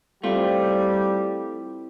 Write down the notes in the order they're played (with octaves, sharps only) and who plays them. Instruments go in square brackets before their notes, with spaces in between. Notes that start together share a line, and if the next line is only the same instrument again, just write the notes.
[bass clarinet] G3 [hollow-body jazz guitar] A3 F4 [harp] C4 E4 [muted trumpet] G4